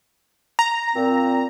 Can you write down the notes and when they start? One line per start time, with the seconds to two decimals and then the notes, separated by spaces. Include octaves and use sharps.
0.59 A#5
0.95 A#2 C4